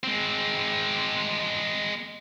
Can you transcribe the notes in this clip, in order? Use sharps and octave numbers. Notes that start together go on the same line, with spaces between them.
G#3 C4